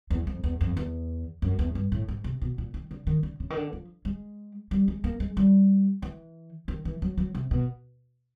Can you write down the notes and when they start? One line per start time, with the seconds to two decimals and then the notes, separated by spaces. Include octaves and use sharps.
0.10 E2
0.27 F2
0.44 E2
0.61 F2
0.77 E2
1.42 F#2
1.59 E2
1.75 G2
1.92 A2
2.08 G#2
2.24 C3
2.41 B2
2.58 A#2
2.74 D#3
2.91 D3
3.07 D#3
3.23 D3
3.40 C#3
3.50 D#3
3.57 D3
3.73 F3
4.05 G#3
4.71 G3
4.88 G#3
5.04 A#3
5.20 G#3
5.37 G3
6.02 E3
6.68 D#3
6.85 E3
7.02 F#3
7.18 F#3
7.35 C3
7.51 B2